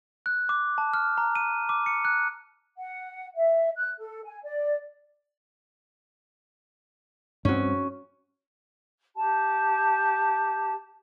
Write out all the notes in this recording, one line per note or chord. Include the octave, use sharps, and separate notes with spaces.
F#6
D6
A5
F6
A#5
D#7
D6
C#7
F#6
F#5
E5
F#6
A4
G#5
D5
G2 C4 C#4 F#4
G4 A5